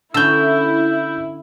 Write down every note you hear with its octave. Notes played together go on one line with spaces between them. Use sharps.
D3 C#4 E4 E6 G6